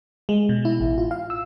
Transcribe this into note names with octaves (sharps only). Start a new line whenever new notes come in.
G#3
B2
E4
A1
F4
F5
E6